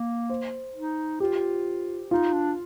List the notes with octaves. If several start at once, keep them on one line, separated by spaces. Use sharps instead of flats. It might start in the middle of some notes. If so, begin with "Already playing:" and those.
Already playing: A#3
C5
D#4
F4 G4
D#4 F4
D4